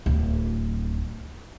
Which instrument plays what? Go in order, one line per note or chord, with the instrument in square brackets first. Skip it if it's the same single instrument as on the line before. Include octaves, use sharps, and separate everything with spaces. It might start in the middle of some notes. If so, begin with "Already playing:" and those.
[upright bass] D1